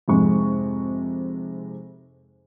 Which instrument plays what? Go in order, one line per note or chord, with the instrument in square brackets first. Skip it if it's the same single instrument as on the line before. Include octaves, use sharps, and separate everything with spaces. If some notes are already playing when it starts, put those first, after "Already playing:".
[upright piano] F2 G#2 C3 G#3 C#6